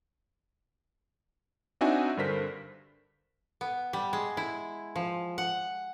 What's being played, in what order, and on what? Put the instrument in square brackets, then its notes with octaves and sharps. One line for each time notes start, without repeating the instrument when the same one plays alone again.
[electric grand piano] C4 D4 D#4 F#4 E5 G#5
G2 D3 A#4 C5 B6
[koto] B3
G3
G#3
E4
F3
F#5